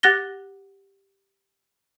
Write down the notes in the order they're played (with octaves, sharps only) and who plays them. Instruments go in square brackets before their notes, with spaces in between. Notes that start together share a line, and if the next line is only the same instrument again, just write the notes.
[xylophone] G4 F#5 F#6 A6 A#6 G7